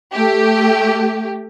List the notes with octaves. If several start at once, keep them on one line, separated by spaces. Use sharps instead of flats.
A3 G4